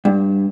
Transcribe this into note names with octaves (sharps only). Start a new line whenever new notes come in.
G2